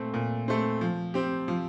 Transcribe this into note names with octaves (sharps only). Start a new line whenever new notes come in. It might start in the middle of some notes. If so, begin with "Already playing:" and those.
Already playing: A#2 A3 C4
A#2
A3 C4
F3
C4 G4
F3